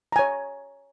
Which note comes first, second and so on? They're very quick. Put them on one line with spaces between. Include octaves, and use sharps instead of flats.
A#5 G#5 C#5